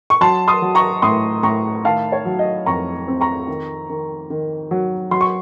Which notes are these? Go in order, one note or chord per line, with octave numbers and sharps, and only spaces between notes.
C#6
F#3 A5 C6
C6 D#6
F#3
A#5 C#6
A2 C6 D#6
A2 A#5 C#6
D#3 F5 A5
C#5
F#3
D#5
F2 A#5 C#6
C4
A#5 C#6
D#3
D#3
D#3
F#3
F#3 C6
C#6